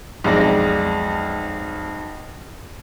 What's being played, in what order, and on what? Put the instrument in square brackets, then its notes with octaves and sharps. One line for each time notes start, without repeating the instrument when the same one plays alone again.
[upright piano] B1 F2 G#3 D5 A#6